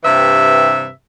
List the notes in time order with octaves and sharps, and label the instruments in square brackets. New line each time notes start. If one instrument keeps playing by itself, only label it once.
[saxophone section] G2 C3 E3 B4 E5